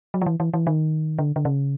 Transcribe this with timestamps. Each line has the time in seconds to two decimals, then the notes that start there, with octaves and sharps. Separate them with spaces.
0.14 F#3
0.22 F3
0.26 E3
0.40 E3
0.54 E3
0.67 D#3
1.18 D3
1.36 D3
1.45 C#3